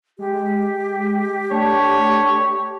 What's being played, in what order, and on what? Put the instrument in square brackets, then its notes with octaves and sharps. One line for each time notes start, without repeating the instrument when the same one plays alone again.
[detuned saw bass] G#3 [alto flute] G4
[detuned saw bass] A3 [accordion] D4 [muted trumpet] C#5